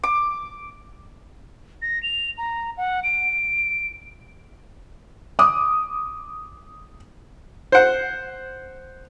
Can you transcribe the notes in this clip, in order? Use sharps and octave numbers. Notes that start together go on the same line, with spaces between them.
D6
A#6
F7
A#5
F#5
D7
D6 D#6
C5 F#5